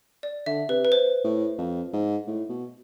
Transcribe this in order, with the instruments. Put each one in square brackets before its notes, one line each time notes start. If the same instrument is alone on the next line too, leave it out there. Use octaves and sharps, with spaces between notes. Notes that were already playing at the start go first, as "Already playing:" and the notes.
[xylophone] D5
[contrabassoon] D3 [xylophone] E5
[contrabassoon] C3 [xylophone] B4
[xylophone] B4
C5
[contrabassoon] A2
F2
G#2
A2
B2